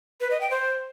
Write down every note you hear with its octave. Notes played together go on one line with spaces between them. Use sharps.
B4
D#5
G5
C5